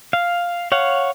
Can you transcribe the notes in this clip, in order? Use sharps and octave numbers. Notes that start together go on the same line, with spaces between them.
F5
C#5 F5 F#5